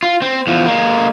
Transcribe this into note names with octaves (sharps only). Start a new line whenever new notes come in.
F4
C4
E2 F3
G#3 A#3